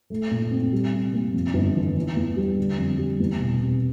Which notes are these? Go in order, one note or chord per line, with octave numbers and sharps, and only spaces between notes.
A3
A#2
C4
G3
C3
A#3
F2
G1
E3
E3
E2
G3
D3
F2
G3
E2
E1
C3